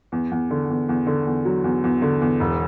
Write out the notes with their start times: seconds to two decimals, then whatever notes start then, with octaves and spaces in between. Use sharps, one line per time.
0.12 E2
0.31 E2
0.51 D3
0.70 E2
0.89 E2
1.07 D3
1.26 E2
1.45 F#3
1.64 E2
1.84 E2
2.02 D3
2.21 E2
2.40 E1